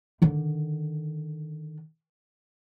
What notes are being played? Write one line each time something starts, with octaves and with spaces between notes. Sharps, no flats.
D3 D#3